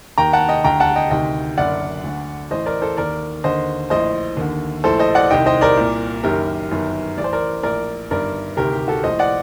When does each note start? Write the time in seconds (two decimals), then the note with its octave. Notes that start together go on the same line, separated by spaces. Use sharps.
0.18 D#2 D#3 G5 A#5
0.33 F#5 A5
0.49 D#5 G5
0.64 D2 D3 G5 A#5
0.80 F#5 A5
0.96 D#5 G5
1.11 D2 C3 D#3 D#5 G5
1.57 F#1 F#2 D3 D5 F#5
2.04 D2 D3
2.51 A1 A2 C5 D#5
2.66 A#4 D5
2.82 A4 C5
2.97 D#2 D#3 A#4 D5
3.44 D#2 D3 C5 D#5
3.90 A#1 A2 C5 D#5
4.37 D#2 D3
4.84 A#1 A2 A4 C5
4.99 C5 D#5
5.15 D5 F#5
5.30 C2 C3 D#3 D#5 G5
5.46 C5 D#5
5.61 A#4 D5
5.77 C2 A#2
6.23 F#1 F#2 D#3 G4 A#4
6.71 G1 F#2 D#3
7.18 A1 A2 D5
7.24 C5
7.33 A#4 D5
7.63 A#1 A2 A#4 D5
8.10 G1 G2 D#3 A#4 D5
8.57 D2 C3 D#3 G4 A#4
8.73 G4
8.88 F#4 A4
9.03 A#1 A2 C5 D#5
9.19 D5 F#5